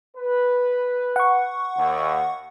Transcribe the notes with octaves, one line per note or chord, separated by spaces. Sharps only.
B4
F#5 C#6
D#2